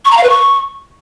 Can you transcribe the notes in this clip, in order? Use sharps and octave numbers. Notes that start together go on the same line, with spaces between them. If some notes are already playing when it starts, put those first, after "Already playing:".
C#6
A#5
F5
B4
C#6